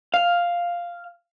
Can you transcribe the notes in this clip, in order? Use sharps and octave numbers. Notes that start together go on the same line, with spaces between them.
F5